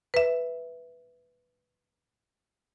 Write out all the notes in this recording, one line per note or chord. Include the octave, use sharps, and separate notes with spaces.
B4 E5